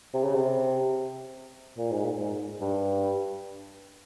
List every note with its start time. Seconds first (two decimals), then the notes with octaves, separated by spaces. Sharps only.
0.14 C3
0.24 C#3
0.35 C3
1.77 A#2
1.91 G#2
2.04 A#2
2.19 G#2
2.61 G2